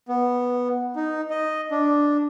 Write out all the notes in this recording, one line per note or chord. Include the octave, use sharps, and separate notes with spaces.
B3
D#4
D#5
D4